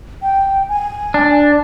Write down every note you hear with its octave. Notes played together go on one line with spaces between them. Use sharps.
G5
G#5
D4